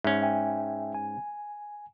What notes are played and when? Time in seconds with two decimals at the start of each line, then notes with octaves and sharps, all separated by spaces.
0.04 G#2 C#4 E5
0.22 E5 G5 G#5
0.94 G#5